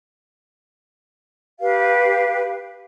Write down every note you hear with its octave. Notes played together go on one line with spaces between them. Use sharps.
G4 B4 F5